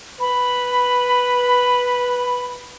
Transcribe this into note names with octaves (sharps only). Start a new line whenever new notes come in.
B4 B5